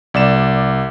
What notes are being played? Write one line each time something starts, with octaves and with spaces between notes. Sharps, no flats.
C2 D5 E7